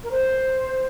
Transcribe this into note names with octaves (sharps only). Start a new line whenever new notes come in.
A#4
C5